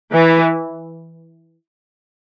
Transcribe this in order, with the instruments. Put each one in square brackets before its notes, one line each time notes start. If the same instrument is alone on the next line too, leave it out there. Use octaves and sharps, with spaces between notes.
[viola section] E3